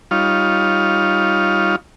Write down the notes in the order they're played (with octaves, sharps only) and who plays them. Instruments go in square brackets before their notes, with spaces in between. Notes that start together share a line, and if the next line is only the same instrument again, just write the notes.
[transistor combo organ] G3 D#4 F4 C#5 F5